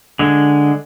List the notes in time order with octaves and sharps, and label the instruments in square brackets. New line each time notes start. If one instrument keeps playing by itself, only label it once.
[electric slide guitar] D3 G#3